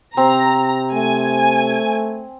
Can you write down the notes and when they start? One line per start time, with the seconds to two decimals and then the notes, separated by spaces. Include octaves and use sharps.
0.17 C3 C4 A#5
0.94 A3 G#5